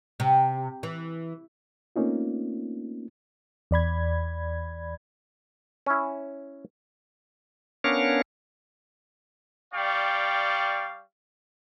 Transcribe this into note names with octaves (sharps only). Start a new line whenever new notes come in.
C3
E3
A3 A#3 C4 C#4 D#4 F4
E2 D5 B5 G#6
C#4 E4
B3 C#4 D4 A#4 C#5 F5
G3 D5 F5 G5 C#6